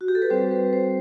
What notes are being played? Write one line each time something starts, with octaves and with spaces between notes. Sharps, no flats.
F#4
G4
A4
B4
G3 C4 F#4 C5
B4
C5